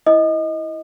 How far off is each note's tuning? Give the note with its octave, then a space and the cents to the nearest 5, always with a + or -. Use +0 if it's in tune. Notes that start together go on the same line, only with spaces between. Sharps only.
E4 +0 D#5 +15 D#6 -40